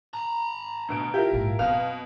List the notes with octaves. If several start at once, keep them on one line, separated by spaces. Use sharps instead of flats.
A5 A#5
D2 B2 D7
E4 F4 G4 A#4
A#1 G#2
F#2 B2 C4 F5